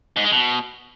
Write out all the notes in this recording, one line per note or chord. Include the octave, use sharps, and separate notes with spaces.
G#2
G#3
B2